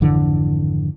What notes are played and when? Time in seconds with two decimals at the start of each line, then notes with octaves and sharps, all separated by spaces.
0.01 G#1 F2 D3 E3